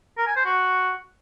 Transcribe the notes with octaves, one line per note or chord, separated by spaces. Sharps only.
A#4
G#5
C5
F#4